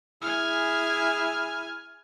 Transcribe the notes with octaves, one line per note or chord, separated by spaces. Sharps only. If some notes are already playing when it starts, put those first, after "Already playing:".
E4 G#4 G#5 F6